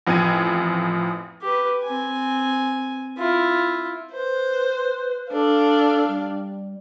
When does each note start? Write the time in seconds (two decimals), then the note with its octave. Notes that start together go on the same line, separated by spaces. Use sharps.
0.07 A1 F2 G5 G#6 D#7
1.42 G4 B4
1.84 C4 G#5
3.18 E4 F4
4.12 B4 C5
5.32 D4 A4 F5
6.08 G3